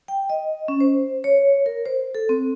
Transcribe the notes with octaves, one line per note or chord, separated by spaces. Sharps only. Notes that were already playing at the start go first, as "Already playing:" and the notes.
G5
D#5
C#4
C5
C#5
A#4
C5
A4
C4